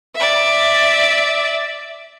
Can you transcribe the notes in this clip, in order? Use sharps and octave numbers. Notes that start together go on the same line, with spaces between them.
D5 E5